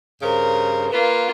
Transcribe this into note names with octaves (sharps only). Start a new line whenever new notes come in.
G2 C#3 A#4 C5
A#3 F4 B4